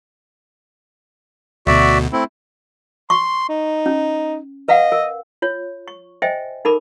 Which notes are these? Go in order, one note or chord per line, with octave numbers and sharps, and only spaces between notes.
D2 B2 F#4 D5 E5
A3 C4 E4
C6 C#6
D#4
C#4
B4 D#5 F5 F#5
A#4
F4 C#5
C#6
C5 D#5 E5 G5 G#5
D#4 A4 A#4 B5 D6